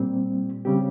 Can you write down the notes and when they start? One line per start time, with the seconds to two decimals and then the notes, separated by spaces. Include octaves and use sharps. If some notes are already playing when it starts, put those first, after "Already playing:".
Already playing: A#2 G3 C4
0.65 C#3 G3 C4 G4